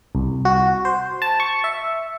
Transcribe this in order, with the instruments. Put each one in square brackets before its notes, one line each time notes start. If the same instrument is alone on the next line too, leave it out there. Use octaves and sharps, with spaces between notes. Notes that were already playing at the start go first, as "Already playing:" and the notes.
[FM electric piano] C2
F#4
C5
A5
C#6
E5